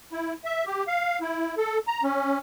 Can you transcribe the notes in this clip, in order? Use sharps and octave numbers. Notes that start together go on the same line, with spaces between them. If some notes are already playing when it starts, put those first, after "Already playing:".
E4
E5
G4
F5
E4
A4
A#5
C#4